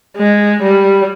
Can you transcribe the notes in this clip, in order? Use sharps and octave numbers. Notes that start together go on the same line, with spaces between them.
G#3
G3